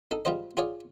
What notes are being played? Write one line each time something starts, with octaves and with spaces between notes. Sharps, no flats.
D#4 A4
G3 G#3 F4 C5 D#5
F4 G#4 C#5 D5